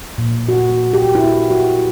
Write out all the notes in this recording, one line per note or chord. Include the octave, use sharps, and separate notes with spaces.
A#2
F#4
G4
E4
F#4